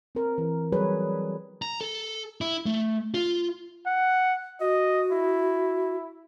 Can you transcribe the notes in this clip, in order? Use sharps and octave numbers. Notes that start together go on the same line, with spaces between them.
C4 A#4
E3
F#3 G3 G#4 B4 C#5
A#5
A4
E4
A3
F4
F#5
F#4 D#5
E4